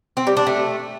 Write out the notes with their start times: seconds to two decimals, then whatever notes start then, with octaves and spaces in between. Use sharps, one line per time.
0.17 C4
0.27 G3
0.37 D4
0.47 A3